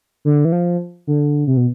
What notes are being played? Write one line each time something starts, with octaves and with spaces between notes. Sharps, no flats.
D3
E3
F3
D3
C3
B2